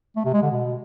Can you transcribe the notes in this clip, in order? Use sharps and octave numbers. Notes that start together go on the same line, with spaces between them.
A3
C3
G#3
D3
B2